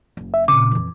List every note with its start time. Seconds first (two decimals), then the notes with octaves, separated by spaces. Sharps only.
0.17 F#1
0.34 E5
0.48 A#2 C#3 C4 D6
0.71 F2 E3